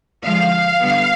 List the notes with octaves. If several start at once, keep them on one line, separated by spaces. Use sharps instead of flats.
D3 F3 G#3 F5
D3 G3 B3